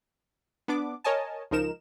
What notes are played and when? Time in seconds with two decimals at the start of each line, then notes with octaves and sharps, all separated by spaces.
0.68 B3 D4 D6
1.04 A#4 C#5 D#5 G#5 A5
1.51 C#2 F3 D#4 A#4 E7